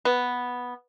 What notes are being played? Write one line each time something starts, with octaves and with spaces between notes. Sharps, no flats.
B3